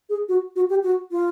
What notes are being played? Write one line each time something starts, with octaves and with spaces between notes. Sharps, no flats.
G#4
F#4
F#4
G4
F#4
F4